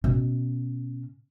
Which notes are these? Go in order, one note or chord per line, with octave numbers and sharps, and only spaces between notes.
B2 C#4